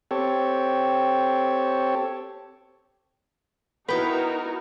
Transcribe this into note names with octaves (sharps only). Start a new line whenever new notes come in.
C4 G4 A4 C#5
B3 D#4 E4 F#4 A#4 B4 G5